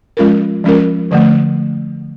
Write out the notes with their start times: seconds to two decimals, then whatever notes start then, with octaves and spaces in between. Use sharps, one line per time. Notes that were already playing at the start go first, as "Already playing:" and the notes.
0.17 F3 G#3 C#4 F4 A#4
0.64 F3 G#3 C#4 F4 A#4
1.11 D3 F3 A3